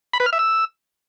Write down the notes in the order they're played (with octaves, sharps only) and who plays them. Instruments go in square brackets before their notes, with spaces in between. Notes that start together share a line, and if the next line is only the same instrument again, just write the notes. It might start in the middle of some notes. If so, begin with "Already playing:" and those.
[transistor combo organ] B5
B4
F6
E5
E6